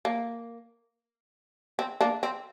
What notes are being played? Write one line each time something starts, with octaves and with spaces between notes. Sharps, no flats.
A#3
C4
A#3 D4
C4